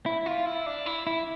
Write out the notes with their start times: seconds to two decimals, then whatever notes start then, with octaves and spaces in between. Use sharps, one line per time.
0.06 E4
0.26 F4
0.46 E4
0.66 D4
0.86 E4
1.07 E4